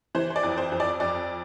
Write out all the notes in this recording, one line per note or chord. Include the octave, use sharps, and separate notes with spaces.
E3 C5
C5
D5
F2
C5
F2
D5
F2 D5